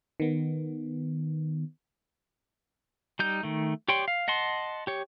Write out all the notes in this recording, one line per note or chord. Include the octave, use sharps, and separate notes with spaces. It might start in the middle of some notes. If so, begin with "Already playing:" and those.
D#3 B3
G3 D#4 G6
D#3 A3
G4 C#5 D5 G5 C6
F5
D#5 F#5 A5 C6
G4 C#5